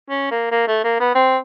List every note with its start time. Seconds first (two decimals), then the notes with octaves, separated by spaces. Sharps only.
0.09 C#4
0.31 A#3
0.51 A#3
0.68 A3
0.84 A#3
1.00 B3
1.15 C4